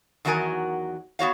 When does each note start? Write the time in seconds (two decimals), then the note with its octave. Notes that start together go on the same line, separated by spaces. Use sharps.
0.25 E2 D#3 F#3 F#4 A#4 G#5
1.19 B3 F#4 C#5 F5